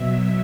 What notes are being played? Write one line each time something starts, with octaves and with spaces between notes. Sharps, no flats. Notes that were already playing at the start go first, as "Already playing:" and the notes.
Already playing: B2 F#3 E5